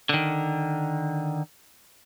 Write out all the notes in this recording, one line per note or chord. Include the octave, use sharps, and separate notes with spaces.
D3 D#3